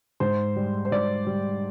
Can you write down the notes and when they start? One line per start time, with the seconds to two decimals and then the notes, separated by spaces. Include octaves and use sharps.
0.20 G#2 C5
0.56 G3
0.85 C5
0.92 G#2 D5
1.27 G3